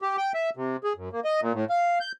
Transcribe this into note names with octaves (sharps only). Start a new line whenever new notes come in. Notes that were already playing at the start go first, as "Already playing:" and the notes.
G4
G5
E5
C3
G#4
F#2
A#3
D#5
A#2
A2
F5
G6